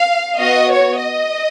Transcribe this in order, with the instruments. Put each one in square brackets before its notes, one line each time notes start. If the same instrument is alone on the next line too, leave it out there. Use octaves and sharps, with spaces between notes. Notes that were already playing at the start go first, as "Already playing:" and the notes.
Already playing: [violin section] F5
B3 F#4 D#5
C#5
D#5